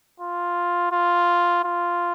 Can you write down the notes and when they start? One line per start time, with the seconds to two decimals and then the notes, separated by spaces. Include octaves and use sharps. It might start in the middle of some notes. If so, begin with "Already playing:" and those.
0.20 F4
0.92 F4
1.64 F4